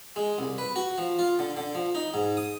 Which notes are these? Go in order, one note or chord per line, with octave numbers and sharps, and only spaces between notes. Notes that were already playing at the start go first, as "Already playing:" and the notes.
G#3
C2
B4
F#4
F3
F4
D3
D3
F3
D#4
G#2
D#6